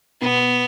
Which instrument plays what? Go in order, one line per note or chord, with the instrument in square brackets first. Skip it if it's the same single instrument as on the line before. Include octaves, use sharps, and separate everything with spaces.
[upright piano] B2 [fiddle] B3